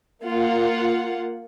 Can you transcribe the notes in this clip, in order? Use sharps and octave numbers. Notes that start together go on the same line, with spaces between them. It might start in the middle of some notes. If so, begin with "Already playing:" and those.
A#3 F4 F#5